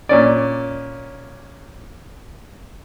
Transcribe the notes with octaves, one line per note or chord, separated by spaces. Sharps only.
A#2 C#4 D5